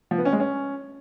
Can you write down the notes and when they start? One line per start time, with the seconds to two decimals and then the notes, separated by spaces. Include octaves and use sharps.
0.11 F3
0.18 B3
0.25 C#4
0.33 G#3
0.40 C#4